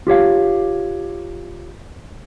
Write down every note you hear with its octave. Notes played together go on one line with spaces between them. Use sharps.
F4 G4 C#5 F5